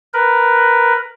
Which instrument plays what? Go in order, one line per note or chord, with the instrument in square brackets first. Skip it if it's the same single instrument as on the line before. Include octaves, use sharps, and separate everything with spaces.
[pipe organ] A#4 B4